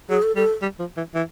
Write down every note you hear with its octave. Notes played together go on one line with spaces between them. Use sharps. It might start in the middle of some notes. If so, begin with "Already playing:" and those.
F#3 G#4
A4
G3 A4
G3
F3
E3
E3